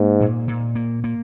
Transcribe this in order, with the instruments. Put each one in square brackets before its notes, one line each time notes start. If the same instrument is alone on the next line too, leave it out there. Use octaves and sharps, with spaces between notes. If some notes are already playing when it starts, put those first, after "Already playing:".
Already playing: [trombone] G#2 [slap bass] A#3
[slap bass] A#2
A#2
A#3
A#3